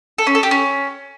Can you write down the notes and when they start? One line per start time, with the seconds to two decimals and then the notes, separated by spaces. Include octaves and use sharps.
0.18 A4
0.27 C#4
0.35 A4
0.43 G4
0.51 C#4